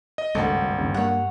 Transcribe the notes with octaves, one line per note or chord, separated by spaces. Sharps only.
D#5
G#1 C#2 G2 A3 F#4 G4 A4
G1 D#2 C#3
G3 A#3 C#5 F#5